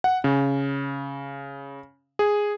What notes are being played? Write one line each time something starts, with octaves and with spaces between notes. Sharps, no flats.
F#5
C#3
G#4